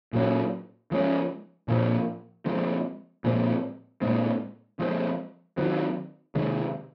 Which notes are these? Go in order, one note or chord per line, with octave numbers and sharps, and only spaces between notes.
A#2 F#3 C#4
F3 G#3 C#4
A#2 F3 C4
F3 G#3 C4
A#2 F3 G#3 C4
A#2 G#3 C4
F3 G#3 C4
D#3 F#3 C4
C3 D#3 G#3